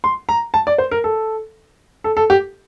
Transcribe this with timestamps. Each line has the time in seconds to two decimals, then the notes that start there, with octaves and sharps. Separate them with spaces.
0.04 C6
0.29 A#5
0.54 A5
0.67 D5
0.78 C5
0.91 A#4
1.04 A4
2.04 A4
2.17 A4
2.30 G4